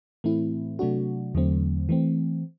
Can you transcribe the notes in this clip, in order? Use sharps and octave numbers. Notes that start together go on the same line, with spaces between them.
A2 E3 A3 C4 E4
C3 F#3 A3 D4 F#4
E2 D3 F#3 A3 C4
E3 A3 C4